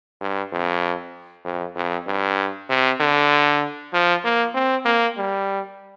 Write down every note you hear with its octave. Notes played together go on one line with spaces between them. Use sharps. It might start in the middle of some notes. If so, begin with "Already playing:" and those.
G2
F2
F2
F2
G2
C3
D3
F3
A#3
C4
A#3
G3